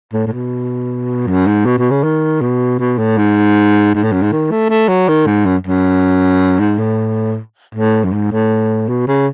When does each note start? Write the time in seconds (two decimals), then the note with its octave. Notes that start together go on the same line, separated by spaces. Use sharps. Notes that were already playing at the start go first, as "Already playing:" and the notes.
0.13 A2
0.27 A2
0.33 B2
1.27 F#2
1.47 G#2
1.66 B2
1.78 B2
1.91 C#3
2.03 D#3
2.41 B2
2.79 B2
2.98 A2
3.18 G#2
3.94 G#2
4.04 A2
4.12 F#2
4.22 G#2
4.32 D#3
4.51 A3
4.69 A3
4.88 F#3
5.09 D#3
5.27 G#2
5.46 F#2
5.67 F#2
6.60 G#2
6.79 A2
7.75 A2
8.04 F#2
8.13 G#2
8.31 A2
8.89 B2
9.08 C#3